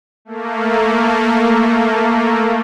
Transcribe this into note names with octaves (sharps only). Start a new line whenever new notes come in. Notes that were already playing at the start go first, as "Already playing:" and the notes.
A3 A#3